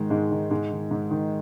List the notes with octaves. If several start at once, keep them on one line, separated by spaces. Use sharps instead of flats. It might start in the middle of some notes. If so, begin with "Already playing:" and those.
Already playing: G#2 D#3 G#3
G#2 G#3
D#3
G#2 G#3
D#3
G#2
D#3